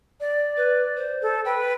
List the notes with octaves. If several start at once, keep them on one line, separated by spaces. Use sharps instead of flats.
D5
B4
C5
A4
B4 G5